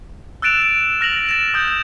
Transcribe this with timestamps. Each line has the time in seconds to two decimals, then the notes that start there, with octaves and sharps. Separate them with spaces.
0.42 E6 F#6 A6 D7 E7 F7
0.62 D7
1.01 F6 A#6 F7 F#7
1.27 A6 E7 F#7
1.54 D#6 E6 G6
1.68 G6